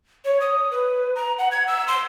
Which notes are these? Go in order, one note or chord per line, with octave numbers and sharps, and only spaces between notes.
C#5
D#6
B4
A#5
F#5
G#6
E6
C6